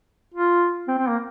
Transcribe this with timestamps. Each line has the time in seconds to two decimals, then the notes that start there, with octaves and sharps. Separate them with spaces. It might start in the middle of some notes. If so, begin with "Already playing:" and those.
0.34 F4
0.88 C4
0.98 C4
1.08 A#3